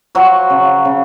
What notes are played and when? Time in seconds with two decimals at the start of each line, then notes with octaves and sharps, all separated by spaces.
0.15 F3 F#3 F#4
0.50 C#3
0.85 C#3